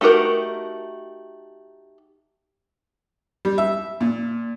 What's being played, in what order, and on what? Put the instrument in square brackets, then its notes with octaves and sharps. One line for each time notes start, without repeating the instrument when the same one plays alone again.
[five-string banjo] A3 D#4 F#4 G4 A#4
[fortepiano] G3
E5
A#2